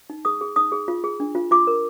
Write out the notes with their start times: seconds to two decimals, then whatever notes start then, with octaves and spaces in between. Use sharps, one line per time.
0.10 D#4
0.25 G#4 D#6
0.41 G#4
0.56 D#4 D#6
0.72 G#4
0.88 F4
1.04 G#4
1.20 D4
1.35 F4
1.51 F4 D6
1.67 A#4